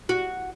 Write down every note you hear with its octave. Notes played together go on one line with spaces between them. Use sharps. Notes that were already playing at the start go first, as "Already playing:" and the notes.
F#4